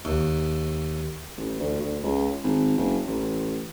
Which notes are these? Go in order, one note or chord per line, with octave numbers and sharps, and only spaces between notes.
D#2
A1
D2
D2
C#2
G#1
F#1
A1